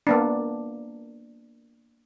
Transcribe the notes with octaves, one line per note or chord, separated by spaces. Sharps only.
A#3 B3 D4